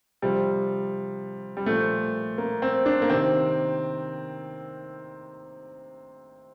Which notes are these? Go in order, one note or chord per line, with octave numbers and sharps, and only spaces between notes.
C3 F3 G3
G3
A#2 F3 A3
A#3
C4
D4
A#3
C3 D#3 C4